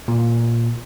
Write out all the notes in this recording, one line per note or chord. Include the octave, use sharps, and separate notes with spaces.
A#2